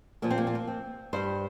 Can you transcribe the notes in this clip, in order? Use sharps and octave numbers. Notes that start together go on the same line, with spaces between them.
A#2 F3 A#3
C4
A#3
C4
A#3
C4
G2 G3 C5